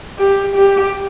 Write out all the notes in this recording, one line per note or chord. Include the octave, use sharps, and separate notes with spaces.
G4
G4